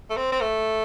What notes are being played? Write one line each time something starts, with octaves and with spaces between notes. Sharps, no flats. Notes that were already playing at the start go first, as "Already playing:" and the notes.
A3
C4
C4
A3